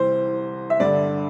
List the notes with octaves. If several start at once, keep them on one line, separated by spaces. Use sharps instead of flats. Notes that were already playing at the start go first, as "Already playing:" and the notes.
Already playing: C2 C3 E3 C5
E5
G2 D3 D5